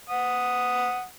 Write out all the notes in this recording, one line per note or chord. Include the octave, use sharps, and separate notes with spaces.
F#5 D#6